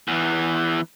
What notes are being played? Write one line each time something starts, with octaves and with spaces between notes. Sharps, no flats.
E2 E3